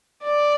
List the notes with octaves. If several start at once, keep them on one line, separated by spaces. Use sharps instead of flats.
D5